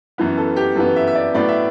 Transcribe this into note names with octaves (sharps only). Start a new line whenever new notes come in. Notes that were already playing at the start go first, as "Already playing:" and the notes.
F#2 E3 B3
A4
G4
F#2 E3 B3 A4
E5
E5
D5
A2 F#3 B3 D5
E5